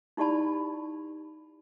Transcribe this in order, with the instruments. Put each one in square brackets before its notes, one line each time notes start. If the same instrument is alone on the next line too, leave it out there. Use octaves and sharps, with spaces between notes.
[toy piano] D#4 E4 G4 D5 A5 B5